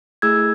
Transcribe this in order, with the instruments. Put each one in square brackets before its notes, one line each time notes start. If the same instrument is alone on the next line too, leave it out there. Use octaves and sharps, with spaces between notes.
[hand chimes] A3 E4 G#4 E6 G#6